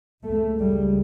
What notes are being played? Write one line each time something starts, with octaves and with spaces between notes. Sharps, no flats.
C#2 C#3 A3
G3